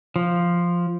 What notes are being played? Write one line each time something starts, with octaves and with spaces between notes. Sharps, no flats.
F3